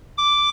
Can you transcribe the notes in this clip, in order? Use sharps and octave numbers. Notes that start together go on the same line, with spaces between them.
D6